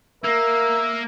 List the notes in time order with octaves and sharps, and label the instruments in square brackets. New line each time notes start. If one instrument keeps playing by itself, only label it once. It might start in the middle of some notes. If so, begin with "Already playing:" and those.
[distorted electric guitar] A#3 [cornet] A#4 [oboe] E5